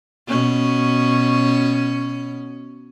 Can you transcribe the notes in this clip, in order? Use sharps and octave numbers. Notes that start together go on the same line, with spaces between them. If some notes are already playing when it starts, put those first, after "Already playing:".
B2 C#4